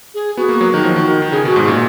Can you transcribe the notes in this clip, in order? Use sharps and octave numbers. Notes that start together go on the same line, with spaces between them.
G#4
B3 F#4
A#3
F#3
D#3
F3
D#3
D#3
C#3 G#4
B2 F#4
G#2
A#2 G#4